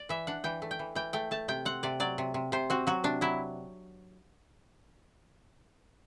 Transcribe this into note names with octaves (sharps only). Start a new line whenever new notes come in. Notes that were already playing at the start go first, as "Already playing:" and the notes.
Already playing: D5
E3 E5
D4 F#5
E3 G5
A3
G5
E3
E3 G5
A3 G5
A3 A5
C3 G5
C4 F#5
C3 D5
F#3 D5
C3
C3
C3 C5
C4 F#4
F#3 F#4
C3 D4
F#3 E4